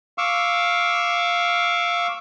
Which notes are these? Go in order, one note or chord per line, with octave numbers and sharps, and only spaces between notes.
F5 C#6 D6 E6